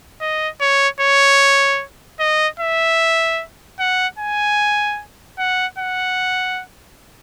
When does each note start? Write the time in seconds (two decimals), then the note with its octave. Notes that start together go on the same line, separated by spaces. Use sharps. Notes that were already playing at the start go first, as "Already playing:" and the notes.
0.21 D#5
0.61 C#5
1.00 C#5
2.20 D#5
2.60 E5
3.79 F#5
4.19 G#5
5.39 F#5
5.78 F#5